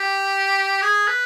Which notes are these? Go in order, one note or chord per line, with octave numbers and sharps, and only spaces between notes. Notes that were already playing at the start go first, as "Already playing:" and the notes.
Already playing: G4
G#4
B4